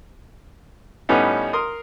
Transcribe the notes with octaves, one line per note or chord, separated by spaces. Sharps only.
A2 G3 B3 C#4 D#4
A#4 C6 D#6